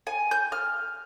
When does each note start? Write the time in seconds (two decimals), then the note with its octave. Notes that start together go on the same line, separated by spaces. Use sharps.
0.07 G#5
0.31 G6
0.52 F6